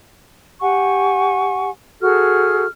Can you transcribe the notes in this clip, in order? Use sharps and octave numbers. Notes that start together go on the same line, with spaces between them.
G4 F#5 G#5 C#6
F#4 G#4 A4 F6